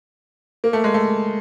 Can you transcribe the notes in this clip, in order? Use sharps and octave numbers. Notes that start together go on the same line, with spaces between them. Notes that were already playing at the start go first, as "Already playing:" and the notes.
A#3
A3
G#3
A3